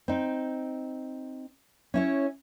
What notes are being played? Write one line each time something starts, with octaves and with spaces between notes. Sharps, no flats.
C4 D#4
C#4 E4 C#5